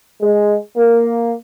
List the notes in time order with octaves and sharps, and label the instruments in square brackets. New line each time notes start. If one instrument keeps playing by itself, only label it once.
[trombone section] G#3
A#3